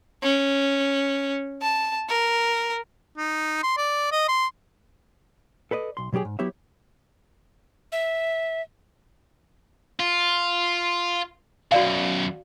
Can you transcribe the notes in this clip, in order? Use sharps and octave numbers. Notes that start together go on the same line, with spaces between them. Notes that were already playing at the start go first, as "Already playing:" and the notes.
C#4
A5
A#4
D#4
C6
D5
D#5
C6
A4 B4 D5 D#5
B1 C6
B2 F#3 G3 G4 G#4
G#2
F#3 B3 E4 G4 C#5 E5
E5
F4
F#2 B2 F#4 D5 F5